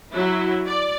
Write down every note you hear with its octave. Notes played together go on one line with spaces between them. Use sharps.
F#3 E4
D5